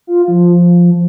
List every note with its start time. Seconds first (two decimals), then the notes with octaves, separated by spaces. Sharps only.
0.07 F4
0.28 F3